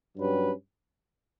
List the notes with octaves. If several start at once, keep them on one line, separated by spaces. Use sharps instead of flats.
G2 F#3 C#4 G4 B4